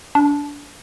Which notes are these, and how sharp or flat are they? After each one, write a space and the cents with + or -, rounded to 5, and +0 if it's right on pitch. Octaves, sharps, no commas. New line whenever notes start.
D4 -20